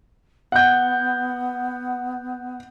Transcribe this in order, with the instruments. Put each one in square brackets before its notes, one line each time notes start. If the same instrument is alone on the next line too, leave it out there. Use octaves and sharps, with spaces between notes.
[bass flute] B3 [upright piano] F#5 G6